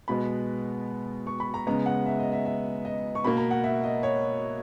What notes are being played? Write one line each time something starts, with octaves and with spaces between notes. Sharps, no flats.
B2 G#3 B3 B5
C#6
B5
A#5
C#3 G#3 B3 A#5
F#5
E5
D#5
E5
E5
D#5
C#6
B2 A#3 B5
A#5
F#5
E5
D#5
C#5